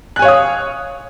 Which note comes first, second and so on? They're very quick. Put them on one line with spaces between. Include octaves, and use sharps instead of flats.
F#6 G#5 C#5 F5 D#6